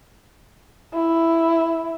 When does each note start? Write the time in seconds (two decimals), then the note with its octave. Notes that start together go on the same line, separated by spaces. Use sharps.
0.94 E4